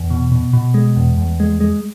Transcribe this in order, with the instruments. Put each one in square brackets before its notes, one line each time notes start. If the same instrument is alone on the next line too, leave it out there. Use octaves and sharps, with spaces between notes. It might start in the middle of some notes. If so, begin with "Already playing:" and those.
Already playing: [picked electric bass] E2
B2
B2
B2
G#3
E2
E2
G#3
G#3